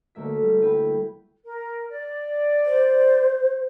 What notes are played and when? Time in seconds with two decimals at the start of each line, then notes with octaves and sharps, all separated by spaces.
0.15 D2 A3 A#3 E5 B6
0.43 G3
0.61 E4 B4 G5
1.44 A#4
1.89 D5
2.66 C5